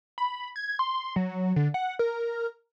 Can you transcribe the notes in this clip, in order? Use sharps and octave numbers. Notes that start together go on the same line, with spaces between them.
B5
G#6
C6
F#3
D3
F#5
A#4